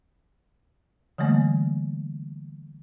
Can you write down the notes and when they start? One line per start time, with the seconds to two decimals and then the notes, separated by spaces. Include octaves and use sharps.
1.18 D3 E3 G3 A3 A#3